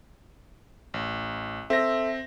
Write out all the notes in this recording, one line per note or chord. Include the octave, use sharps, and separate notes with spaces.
A1
C4 A4 E5 A#6